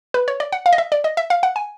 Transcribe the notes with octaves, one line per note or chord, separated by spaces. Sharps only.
B4
C#5
D5
F#5
F5
D#5
E5
D5
D#5
E5
F5
F#5
G#5